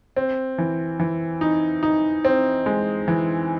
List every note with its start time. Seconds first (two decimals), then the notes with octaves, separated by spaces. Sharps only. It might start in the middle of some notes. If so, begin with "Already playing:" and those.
0.16 C4
0.58 E3
0.99 E3
1.41 D#4
1.83 D#4
2.25 C4
2.66 G#3
3.08 E3